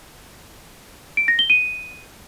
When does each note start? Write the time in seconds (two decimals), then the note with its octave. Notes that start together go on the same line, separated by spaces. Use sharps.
1.17 D7
1.28 A#6
1.39 G7
1.50 D#7